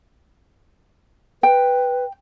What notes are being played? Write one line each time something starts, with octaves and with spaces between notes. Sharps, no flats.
B4 G5